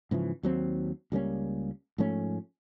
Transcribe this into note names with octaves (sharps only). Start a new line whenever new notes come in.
G#2 C#3 E3 F3
D#2 F#3 C4
C#2 G3 A#3 C#4
G#2 F3 A3 C#4